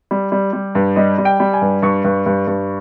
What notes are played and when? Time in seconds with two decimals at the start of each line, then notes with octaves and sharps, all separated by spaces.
0.11 G3
0.32 G3
0.53 G3
0.75 G2
0.96 G3 D#5
1.18 G3
1.25 G5
1.40 G3
1.54 G#5
1.61 G2
1.82 G2 C#6
2.04 G2
2.26 G2
2.47 G2